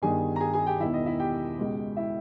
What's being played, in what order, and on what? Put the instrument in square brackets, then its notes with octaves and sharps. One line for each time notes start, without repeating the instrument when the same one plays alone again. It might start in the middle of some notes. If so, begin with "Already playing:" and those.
[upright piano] G1 G2 D#3 G#4 G#5
A#5
G#4 G#5
G#4 G#5
G4 G5
E1 E2 D#3 E4 E5
D#5
E4 E5
G4 G5
C#2 B2 G#3
E4 E5